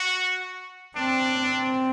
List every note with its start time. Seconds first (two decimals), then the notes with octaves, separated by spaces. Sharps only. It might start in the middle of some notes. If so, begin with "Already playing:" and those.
Already playing: F#4
0.96 C4 D4
1.41 C4